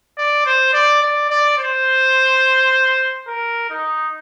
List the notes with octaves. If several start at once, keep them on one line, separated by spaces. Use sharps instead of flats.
D5
C5
D5
D5
D5
C5
A#4
D#4